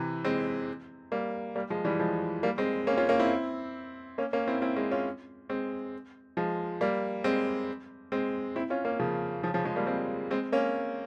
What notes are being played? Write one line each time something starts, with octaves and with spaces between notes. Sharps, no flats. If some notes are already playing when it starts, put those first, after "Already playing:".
Already playing: C3 E3
G#3 C4
G3 A#3
G3 A#3
F3 G#3
E3 G3
F3 G#3
G3 A#3
G#3 C4
A#3 C#4
C#4 F4
A#3 C#4
C4 E4
A#3 C#4
A#3 C#4
C4 E4
C4 E4
G#3 C4
C#4 F4
G#3 C4
F3 G#3
G3 A#3
G#3 C4
G#3 C4
C4 E4
C#4 F4
A#3 C#4
C#3 F3
C#3 F3
C#3 F3
F3 G#3
G3 A#3
G#3 C4
G#3 C4
A#3 C#4